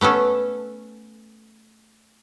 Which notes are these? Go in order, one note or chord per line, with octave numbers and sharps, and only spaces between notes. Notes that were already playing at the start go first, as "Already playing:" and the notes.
A3 B3 C#4 A4